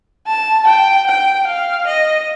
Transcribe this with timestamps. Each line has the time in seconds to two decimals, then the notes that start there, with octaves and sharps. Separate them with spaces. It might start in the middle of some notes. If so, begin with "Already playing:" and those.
0.27 A5
0.67 G5
1.07 G5
1.47 F5
1.87 D#5